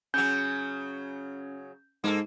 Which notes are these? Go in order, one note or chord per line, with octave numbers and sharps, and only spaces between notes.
C#3 F#3 C#4 G6
G#2 A#3 A4